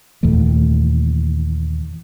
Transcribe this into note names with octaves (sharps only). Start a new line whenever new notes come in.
D#2 A#2 E3 A3